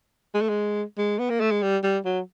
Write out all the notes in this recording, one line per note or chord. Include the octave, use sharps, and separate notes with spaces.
G#3
A3
G#3
G#3
B3
A#3
A3
G#3
G3
G3
F#3